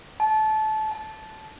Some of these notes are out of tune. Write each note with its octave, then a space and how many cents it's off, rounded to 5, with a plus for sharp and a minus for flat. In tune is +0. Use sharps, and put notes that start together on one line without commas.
A5 -25
A5 -15